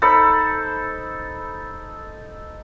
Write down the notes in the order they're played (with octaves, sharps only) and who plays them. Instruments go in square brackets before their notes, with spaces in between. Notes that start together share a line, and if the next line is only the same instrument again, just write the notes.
[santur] D#4 A4 C5 B5